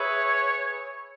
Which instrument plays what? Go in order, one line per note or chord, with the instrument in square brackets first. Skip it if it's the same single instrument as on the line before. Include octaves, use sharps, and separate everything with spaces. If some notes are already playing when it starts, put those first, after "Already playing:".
Already playing: [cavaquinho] G#4 B4 E5 [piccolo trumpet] C#5